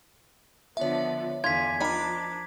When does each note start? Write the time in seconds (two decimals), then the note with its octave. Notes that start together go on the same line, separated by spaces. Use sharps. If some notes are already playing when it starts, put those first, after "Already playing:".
0.77 D3 F3 B3 C#5 E5
1.44 E2 D3 F4 G#5 G#6 B6
1.80 F3 D4 D#4 A#4 A#5 B5 D6